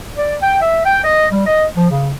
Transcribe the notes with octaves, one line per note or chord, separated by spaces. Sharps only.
D5
G5
E5
G5
D#5
G3
D#5
F3
C#3